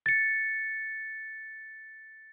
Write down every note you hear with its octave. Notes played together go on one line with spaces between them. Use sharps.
A6 C#7